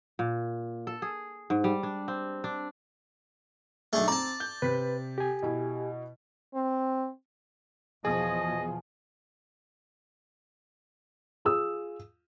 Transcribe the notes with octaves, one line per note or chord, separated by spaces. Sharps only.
A#2
A4
G#4
G#2
G3
D4
C4
D4
B1 A3 D4 G#4
C4 D5 A5 A#5
G6
C3 B4 B6
G4 G#5
B2 E4
C4
E2 B2 F3 G#4 D#5 G#5
F4 G#4 D#6 E6